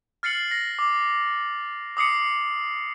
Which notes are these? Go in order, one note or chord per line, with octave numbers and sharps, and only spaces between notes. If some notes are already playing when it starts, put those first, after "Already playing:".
F6 A6 C7 C#7 F#7
A#6
D6
D6 D#6 C7 C#7